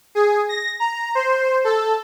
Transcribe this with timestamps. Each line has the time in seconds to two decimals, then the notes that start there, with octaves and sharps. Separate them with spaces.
0.15 G#4
0.49 A#6
0.80 A#5
1.15 C5
1.64 A4